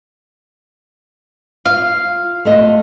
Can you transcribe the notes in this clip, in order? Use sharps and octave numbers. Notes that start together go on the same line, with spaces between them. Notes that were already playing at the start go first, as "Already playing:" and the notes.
F4 F5
A3 F4 D#5